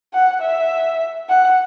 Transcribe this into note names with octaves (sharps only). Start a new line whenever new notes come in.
F#5
E5
F#5